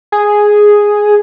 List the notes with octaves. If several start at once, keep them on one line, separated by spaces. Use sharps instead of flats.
G#4